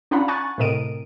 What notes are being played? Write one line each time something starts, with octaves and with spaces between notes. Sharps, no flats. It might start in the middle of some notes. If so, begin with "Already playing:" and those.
C#4 D4 F4 F#5 A#5 B5
G#5 C#6 F#6 A6
A2 C3 A#4 D#5 D7 D#7